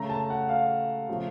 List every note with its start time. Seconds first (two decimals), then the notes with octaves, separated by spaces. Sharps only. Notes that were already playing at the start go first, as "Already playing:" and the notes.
Already playing: C#3 A3 A#5
0.10 A5
0.30 F#5
0.49 F5
1.09 C#3 F3 A3